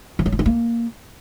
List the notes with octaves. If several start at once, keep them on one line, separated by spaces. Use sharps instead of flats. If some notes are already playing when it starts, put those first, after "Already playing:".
F3
F#3
E4
D#4
A#3